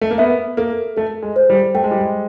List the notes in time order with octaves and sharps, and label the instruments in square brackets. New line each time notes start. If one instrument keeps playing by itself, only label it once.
[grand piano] A3
A#3
[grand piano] B3 [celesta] E5
[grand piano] A#3 [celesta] A4
[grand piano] A3 [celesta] A4
[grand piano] G#3
[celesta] C5
[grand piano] G3
[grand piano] A3 [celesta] G5
[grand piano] G#3
G3
G#3